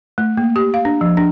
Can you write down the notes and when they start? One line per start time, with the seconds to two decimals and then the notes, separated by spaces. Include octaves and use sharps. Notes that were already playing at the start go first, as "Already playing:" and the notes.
0.18 A3
0.37 A#3
0.56 G4
0.74 F5
0.85 D4
1.01 F3
1.17 D4